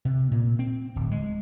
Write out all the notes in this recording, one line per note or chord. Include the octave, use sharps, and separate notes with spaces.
C3
A#2
C4
D1
G#3